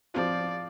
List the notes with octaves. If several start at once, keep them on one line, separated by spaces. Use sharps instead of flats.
F3 C4 F4 D5